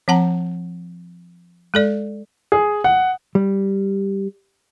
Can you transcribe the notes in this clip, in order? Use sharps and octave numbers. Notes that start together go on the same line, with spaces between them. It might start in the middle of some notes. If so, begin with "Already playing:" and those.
F3 C4 F#5 A5 A#5
G#3 A4 D5
G#4
F#5
G3